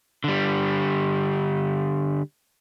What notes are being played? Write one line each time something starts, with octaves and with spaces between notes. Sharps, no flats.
D3 G3